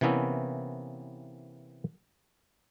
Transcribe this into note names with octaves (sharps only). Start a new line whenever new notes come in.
C3 E3 A#3 B3 C#4 E4